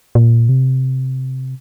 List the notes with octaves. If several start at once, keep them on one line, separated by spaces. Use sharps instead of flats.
A#2
C3